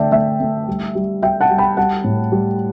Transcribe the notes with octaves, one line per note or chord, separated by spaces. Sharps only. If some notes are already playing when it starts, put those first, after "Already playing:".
Already playing: D3 A3 D5 E5 G5 A5
A3 E5
A3
G3
G3
G3 E5 G5
F#5 A5
G3
G5 B5
G3 F#5 A5
A2
G3